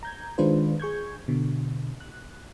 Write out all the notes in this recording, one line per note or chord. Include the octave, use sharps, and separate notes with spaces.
A#5 G6 G#6
D#3 G#3 D4 F4 B4 C5
G#4 C#6 G6 G#6
B2 D3
F#6